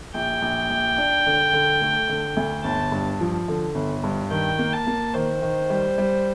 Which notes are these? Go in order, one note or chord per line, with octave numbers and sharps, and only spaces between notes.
A#1 G5
A#1
A#1
D4
D3
D3
A3
D3
D2
G1 A5
G2
F3
D3
G1
G2
D#3 G5
A#3
A5
A#3
D#3 C5
D#3
G3
G3